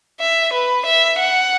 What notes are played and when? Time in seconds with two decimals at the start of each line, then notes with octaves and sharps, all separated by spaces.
0.20 E5
0.53 B4
0.86 E5
1.19 F#5